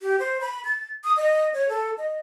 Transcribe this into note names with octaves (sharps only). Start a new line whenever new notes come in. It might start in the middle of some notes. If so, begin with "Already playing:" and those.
G4
C5
B5
A6
D#6
D#5
C#5
A4
D#5